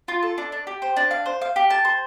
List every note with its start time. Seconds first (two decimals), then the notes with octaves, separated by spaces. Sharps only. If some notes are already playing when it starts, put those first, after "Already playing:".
0.08 F4
0.23 A4
0.38 D4
0.52 D4
0.67 G4
0.82 C5
0.97 D4
1.11 F5
1.26 C5
1.41 F5
1.56 G4
1.70 A5
1.85 C5